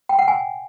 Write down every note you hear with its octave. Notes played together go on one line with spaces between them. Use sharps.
G5
F#5
G#5